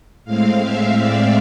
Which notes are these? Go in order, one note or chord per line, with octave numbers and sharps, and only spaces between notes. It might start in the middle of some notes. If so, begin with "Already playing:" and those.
A2 G#3 C4 F5
E5
D5